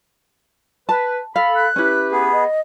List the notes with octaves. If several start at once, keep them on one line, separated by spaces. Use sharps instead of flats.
B4 A5
A4 F5 B5
F#6
C#4 E4 G4 B4
B3 G#4
D#5